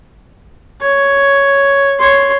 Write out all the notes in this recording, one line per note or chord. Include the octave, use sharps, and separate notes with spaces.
C#5
C#5 C6